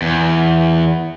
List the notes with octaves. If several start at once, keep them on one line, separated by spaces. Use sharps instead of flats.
E2